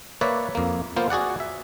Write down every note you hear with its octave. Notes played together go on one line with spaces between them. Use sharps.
A#3 B4 C#5 D5 E5
F2 A#3
A#3 B3 F4 C5
F#4 G#4 D5 F#5
E5